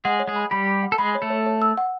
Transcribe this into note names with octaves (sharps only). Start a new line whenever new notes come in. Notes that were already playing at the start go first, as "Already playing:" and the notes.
G#3 G#4 F#5
C#5
G#3 G#4
B5
G3 G4 B5
B5
F#5
A4
G#3 G#4 B5
C#5
A3 A4
C#5
C#5
E6
F#5